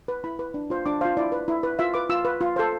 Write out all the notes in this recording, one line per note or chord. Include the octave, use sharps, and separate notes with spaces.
B4
E4 B5
B4
D4
F4 C5
D4 D6
F4 C5 F5
E4 D5
B4
E4
B4
F4 E5
B4 D6
F4 E6
B4
F4
A4 C5